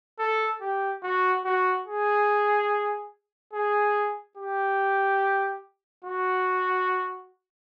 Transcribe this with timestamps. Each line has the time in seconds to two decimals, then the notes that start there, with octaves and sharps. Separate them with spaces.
0.19 A4
0.61 G4
1.03 F#4
1.45 F#4
1.87 G#4
3.53 G#4
4.37 G4
6.05 F#4